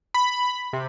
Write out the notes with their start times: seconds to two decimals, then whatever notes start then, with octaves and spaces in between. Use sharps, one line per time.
0.14 B5
0.73 C3